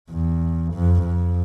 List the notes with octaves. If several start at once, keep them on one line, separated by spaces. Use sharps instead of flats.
E2
F2
F2